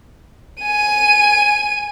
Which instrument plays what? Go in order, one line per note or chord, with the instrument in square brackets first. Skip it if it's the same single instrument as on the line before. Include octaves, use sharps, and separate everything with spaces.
[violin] G#5 D#7